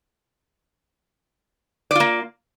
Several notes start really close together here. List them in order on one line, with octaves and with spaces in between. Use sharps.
D5 F4 A#3